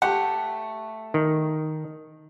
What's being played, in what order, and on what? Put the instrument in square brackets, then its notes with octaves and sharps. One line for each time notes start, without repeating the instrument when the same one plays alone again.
[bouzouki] A3 [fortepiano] G4 F#5
[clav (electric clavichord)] D#3